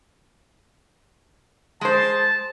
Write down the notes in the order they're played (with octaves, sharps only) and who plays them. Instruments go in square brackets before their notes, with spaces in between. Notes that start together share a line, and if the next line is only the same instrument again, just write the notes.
[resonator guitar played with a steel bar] G#3 C5 [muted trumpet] A5